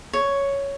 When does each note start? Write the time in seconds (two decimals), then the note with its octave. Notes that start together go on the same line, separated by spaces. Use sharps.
0.13 C#5